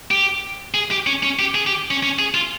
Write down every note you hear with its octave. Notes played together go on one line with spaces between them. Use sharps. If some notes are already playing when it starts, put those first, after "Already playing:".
G4
G#4
G4
C#4
C#4
G4
G#4
G4
C#4
C#4
G#4
F4